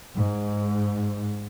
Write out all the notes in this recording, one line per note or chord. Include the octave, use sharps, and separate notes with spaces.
G#2